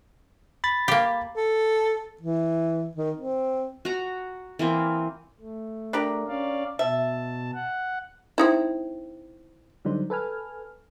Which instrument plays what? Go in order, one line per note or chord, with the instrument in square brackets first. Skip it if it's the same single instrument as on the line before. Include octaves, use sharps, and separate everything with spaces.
[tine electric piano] B5 A6
[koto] A#3 G4
[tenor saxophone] A4
E3
D#3
C4
[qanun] F#4 A#5
E3 A#3 C4
[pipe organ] A3
[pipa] D4 G4 A#4
[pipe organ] C#4 D5 F5
[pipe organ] B2 A5 [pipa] E5
[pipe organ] F#5
[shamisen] C4 D#4 E4
[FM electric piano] D3 F#3 G3 D#4 C5
A4 B4 G#5 F6